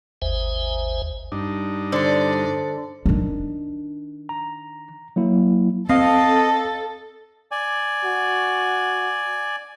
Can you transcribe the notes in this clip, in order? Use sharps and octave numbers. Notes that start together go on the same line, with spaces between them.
G#1 D#2 C5 E5 G#5
G2 D4 D#4
D3 C5 D5 C#7
D#3 D4
A#5
F#3 A#3 E4
C4 A4 D#5 F5
D5 G#5
F#4